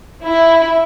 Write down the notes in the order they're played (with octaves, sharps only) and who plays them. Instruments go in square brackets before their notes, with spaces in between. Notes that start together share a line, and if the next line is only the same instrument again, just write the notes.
[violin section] E4